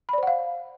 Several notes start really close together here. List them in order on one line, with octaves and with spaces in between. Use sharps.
B5 D5 C5 F#5 F5